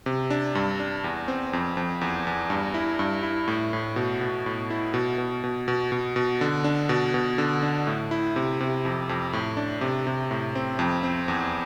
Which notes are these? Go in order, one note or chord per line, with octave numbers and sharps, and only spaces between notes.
C3
D4
G2
D4
E2
C4
F2
F2
E2
E2
G2
E4
G2
E4
A2
A2
B2
B2
A2
E4
B2
B2
B2
B2
B2
B2
D3
D4
B2
B2
D3
D4
A2
E4
C3
C3
F2
F2
A2
D4
C3
C3
A2
C4
F2
C4
E2